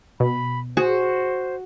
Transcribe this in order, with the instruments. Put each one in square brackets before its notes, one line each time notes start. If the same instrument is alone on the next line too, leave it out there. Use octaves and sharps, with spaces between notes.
[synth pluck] B2 [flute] B5
[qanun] F#4 [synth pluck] G#4 [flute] C5